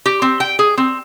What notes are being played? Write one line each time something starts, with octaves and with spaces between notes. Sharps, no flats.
G4
C4
G5
G#4
C4